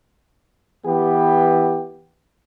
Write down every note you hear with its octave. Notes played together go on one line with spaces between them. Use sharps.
E3 B3 G4